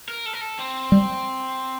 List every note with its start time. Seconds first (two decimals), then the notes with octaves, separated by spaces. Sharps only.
0.08 A#4
0.26 A4
0.33 A#4
0.41 A4
0.59 C4
0.92 G3